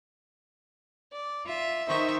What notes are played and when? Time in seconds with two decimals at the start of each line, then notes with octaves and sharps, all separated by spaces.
1.12 D5
1.46 F4 E5
1.88 D#3 D#4 C5 E5 C#6